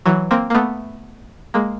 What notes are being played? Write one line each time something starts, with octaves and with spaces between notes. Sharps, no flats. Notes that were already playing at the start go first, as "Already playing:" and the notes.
E3 F#3
A#3 C4
A#3
A3 B3
G#3 A#3